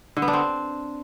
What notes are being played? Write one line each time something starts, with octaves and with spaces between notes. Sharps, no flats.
D3
B3
D4
C4